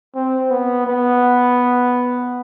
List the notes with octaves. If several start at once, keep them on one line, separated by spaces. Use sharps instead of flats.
C4
B3
B3